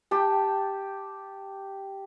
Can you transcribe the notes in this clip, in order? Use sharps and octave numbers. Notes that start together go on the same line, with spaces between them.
G4 G5 A5